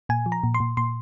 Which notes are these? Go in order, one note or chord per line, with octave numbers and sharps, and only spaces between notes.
A#2 G#5
F3
A#5
A#2
C6
A#2
A#2 C6